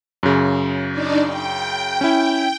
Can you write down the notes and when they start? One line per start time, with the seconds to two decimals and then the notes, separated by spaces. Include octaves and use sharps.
0.23 F#2 C#3
0.91 D4 D#4 D5
1.24 G5
2.01 C#4 E4